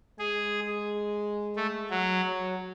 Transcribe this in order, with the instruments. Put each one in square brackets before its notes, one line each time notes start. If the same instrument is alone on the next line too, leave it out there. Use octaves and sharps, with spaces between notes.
[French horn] G#3 [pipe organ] G#4
[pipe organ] A3
F#3
[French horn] F#3